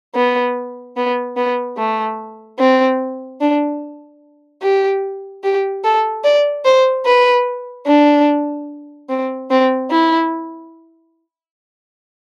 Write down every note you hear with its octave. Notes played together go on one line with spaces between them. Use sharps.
B3
B3
B3
A3
C4
D4
G4
G4
A4
D5
C5
B4
D4
C4
C4
E4